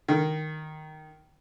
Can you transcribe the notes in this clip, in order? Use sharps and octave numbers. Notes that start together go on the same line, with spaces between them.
D#3